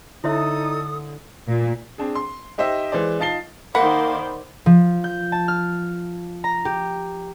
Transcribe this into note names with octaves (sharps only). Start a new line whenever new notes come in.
D3 D#4 E4 A4 C#5 E5 D#6
A#2
C4 D4 G#4
C6
D#4 G4 C5 D#5 E5
E3 G#3 C5 D5
D#4 F4 A5 A6 C7 G7
D#3 A#3 C5 D5 F#5 B5
F3
G6
A5
F6
A#5
G4